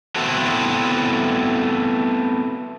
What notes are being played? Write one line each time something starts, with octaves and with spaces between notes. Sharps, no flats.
A3 B3 C4 E4 F#4 A4